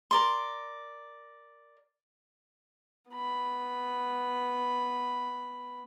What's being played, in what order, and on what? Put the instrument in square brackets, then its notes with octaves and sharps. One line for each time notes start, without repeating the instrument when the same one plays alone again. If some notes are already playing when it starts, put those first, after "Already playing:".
[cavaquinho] A#4 D5 C6
[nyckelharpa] B3 B5